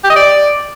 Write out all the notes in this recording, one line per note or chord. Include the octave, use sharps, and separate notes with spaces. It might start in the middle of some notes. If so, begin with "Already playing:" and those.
G4
D#5
D5